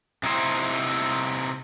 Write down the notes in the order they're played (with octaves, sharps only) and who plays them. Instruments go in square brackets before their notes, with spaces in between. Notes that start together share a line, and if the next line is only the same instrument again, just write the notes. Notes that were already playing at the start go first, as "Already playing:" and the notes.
[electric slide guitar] C3 D#4 E4 C5